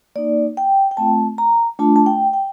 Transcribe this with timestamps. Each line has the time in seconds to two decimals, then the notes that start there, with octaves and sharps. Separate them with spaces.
0.16 A#3 D#4 D5
0.57 G5
0.91 G5
0.97 A3 C4 F4 A5
1.38 A#5
1.79 A3 D4 F4 A5
1.96 A5
2.06 G5
2.33 G5